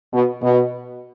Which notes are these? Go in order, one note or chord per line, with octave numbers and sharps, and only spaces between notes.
B2
B2